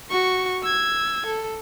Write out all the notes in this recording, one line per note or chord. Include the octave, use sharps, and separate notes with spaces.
F#4 C#6
E6 G#6
A4